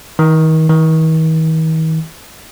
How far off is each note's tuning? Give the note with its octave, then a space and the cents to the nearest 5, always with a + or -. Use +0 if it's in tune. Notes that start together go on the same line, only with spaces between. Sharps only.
D#3 +35
D#3 +45